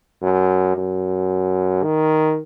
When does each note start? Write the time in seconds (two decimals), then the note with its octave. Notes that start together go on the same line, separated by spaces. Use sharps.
0.22 F#2
0.76 F#2
1.83 D#3